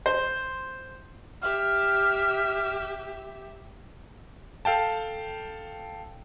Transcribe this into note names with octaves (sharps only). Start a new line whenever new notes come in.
C5
G4 E5 F6
A4 F5 G5 A5